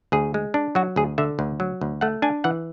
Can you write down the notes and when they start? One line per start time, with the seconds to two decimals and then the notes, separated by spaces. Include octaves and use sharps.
0.12 D2 G#4
0.34 G#3
0.54 D4
0.75 F#3 F#4
0.96 D2 G#4
1.18 D3 E5
1.39 D2
1.60 F#3
1.81 D2
2.01 A3 F#5
2.22 D4 G#5
2.44 E3 F#5